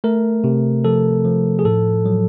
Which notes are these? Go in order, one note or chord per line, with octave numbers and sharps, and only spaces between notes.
A3 A#4
C3
F3 A4
F3
G#4
A2 A4
F#3